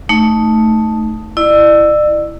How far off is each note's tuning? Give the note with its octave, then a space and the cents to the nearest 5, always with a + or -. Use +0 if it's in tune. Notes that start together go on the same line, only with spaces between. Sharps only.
A3 +0 D#4 +0
E4 +5 D5 +40